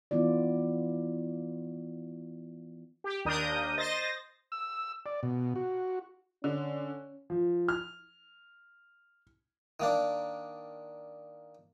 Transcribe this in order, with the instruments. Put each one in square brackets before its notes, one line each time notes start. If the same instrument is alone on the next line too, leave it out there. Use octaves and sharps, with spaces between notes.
[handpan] E3 B3 E4 F4 D5
[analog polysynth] G4
D#2 D4 A#4 D#6 G6
C5 D#5 A6 A#6
[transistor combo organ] E6
D5
B2
F#4
[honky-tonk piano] D3 [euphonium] C#4
[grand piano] F3
F6
[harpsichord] D#3 A#3 D4